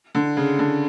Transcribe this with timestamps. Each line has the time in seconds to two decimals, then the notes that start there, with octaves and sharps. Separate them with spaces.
0.15 D3
0.37 C#3
0.59 D3